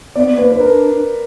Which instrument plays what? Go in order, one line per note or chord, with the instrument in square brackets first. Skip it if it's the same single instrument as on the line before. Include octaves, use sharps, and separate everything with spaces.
[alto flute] B3 [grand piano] D5
[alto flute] B3
[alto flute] A#3 [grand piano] B4
[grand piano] B4
[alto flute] D4 [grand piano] A#4